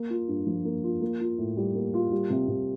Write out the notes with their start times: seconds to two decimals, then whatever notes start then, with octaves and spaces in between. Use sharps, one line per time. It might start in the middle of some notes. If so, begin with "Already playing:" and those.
Already playing: A#3
0.10 F4
0.28 G2
0.47 F3
0.65 A#3
0.83 F4
1.01 A#3
1.20 F4
1.38 A2
1.57 G3
1.75 A#3
1.94 F4
2.12 G3
2.30 C3
2.48 C3